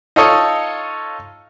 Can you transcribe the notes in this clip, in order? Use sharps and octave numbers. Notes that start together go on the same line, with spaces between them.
D#4 F4 A4 C#5 D#5